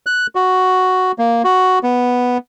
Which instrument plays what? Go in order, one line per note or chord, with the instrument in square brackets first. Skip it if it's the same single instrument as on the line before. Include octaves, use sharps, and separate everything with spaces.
[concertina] F#6
F#4
A#3
F#4
B3